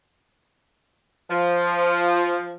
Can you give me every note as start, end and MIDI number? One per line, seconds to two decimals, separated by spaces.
1.30 2.57 53